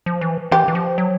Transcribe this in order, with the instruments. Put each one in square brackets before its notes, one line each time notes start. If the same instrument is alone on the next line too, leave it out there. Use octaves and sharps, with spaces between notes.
[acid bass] F3
E3
[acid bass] E3 [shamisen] G4
[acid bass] E3
F3
F#3